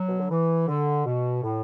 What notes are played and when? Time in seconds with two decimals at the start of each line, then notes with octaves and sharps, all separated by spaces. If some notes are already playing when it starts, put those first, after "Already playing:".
Already playing: F#3
0.09 B2
0.19 D3
0.30 E3
0.68 D3
1.06 B2
1.43 A2